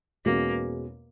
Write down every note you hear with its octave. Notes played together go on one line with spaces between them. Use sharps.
E2 B2 G#3 A#3 C#4 F#4